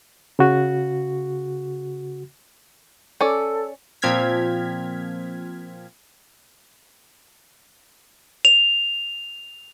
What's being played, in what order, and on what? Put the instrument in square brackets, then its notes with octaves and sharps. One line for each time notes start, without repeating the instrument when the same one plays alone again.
[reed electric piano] C#3 F#4
[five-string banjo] C#4 D5 [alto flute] A4
[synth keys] A#2 F3 C4 F6 G#6 B6
[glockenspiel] F7